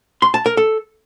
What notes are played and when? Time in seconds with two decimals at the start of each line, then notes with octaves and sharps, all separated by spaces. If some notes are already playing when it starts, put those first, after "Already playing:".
0.22 C6
0.34 A5
0.46 A#4
0.57 A4